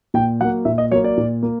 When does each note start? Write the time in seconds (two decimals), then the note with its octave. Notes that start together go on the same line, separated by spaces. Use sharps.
0.14 A#2 G5
0.40 F#3 F#5
0.44 A#3
0.65 A#2 E5
0.78 D#5
0.91 F#3 C#5
0.95 A#3
1.04 D5
1.17 A#2
1.43 A#3